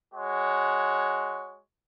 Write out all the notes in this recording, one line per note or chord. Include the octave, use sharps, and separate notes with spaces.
G#3 F#4 C#5